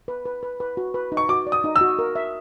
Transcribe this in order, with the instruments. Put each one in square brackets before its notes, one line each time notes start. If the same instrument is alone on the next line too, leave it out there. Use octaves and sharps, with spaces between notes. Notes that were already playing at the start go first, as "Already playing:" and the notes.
[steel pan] B4
B4
B4
B4
F#4
B4
D#4
[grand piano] C#6
[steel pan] F#4 [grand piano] D6
[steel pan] D5
[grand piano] D#6
[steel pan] D#4
[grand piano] E6
[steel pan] F#4
A#4
E5